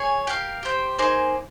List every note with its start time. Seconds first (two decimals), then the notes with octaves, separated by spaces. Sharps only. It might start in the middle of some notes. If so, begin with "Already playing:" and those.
Already playing: G#4 C#5 G#5
0.27 G4 A#4 F5
0.63 G4 C5 G5
0.99 A#3 D#4 G#4 C5